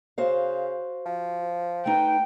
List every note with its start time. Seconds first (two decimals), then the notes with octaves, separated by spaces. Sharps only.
0.18 C#3 F#4 C5 F5
1.06 F3
1.86 A3 D#4 B4 G5